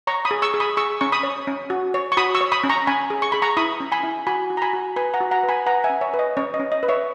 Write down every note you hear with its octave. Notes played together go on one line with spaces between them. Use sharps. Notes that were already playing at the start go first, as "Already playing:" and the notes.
C#5 A#5 C#6
B5 D#6
G#4
C#6 E6
G#4
B5 D#6
G#4 C#6 E6
C#4 C#6
B5 D#6
C#5
C#4
F#4
C#5
C#6
F#4 B5 D#6
C#6 E6
C#5
B5 D#6
C#4
A#5 C#6
C#4 G#5 B5
G#4
C#6
G#4 B5
A#5 C#6
E4 B5 D#6
C#4
G#5 B5
E4
F#4 G#5 B5
F#4
A#5
G#5 B5
F#4
B4 G#5 B5
F#5 A#5
F#4
F#5 A#5
B4
G#5 B5
B4 F#5 A#5
E5 G#5
C#4
C#5 E5
B4
D#5
C#4 C#5
D#5
C#4
D#5
B4
C#5 E5